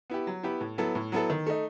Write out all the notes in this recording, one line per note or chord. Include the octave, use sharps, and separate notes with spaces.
B3 E4 G4
F#3
B3 E4 G4
A2
F#3 B3 E4 A4
A2
F#3 B3 E4 A4
D#3
A3 D#4